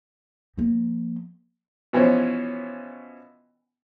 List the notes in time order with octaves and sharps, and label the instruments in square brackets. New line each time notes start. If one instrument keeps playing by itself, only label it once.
[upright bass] F3 A#3
[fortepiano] B2 E3 F3 C#4